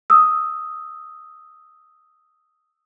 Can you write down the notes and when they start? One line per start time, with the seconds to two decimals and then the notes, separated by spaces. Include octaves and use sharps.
0.10 D#6 E6